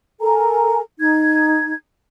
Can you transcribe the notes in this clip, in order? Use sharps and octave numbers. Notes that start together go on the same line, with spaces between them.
A4 A#4 G#5 A#5
D#4 G#6